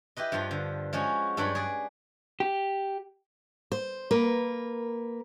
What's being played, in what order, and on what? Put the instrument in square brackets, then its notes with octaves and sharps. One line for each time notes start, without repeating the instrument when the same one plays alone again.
[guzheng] E4 G4 B4 D#5
G2 F3 F4 F5
D3
F3 G#3 C#4 F#4
G2 F#3 D4 B4 C#5 B5
G#4 D5
[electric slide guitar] G4
[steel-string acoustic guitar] C5
A#3 A#4 B4